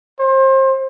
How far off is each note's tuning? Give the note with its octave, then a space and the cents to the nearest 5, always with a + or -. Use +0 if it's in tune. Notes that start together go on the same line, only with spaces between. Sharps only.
C5 +30